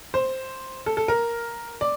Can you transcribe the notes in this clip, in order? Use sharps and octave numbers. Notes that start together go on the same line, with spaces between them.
C5
A4
A4
A#4
D5